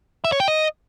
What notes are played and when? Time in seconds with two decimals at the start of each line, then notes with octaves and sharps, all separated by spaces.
0.24 E5
0.32 C#5
0.40 G5
0.48 D#5